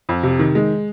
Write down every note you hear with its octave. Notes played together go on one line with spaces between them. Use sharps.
F2
C3
D#3
G#3